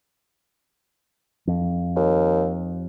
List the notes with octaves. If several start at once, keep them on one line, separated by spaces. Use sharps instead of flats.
F2
D#2